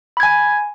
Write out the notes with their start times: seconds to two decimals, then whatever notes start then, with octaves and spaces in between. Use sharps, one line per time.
0.17 B5
0.20 G#6
0.23 G#5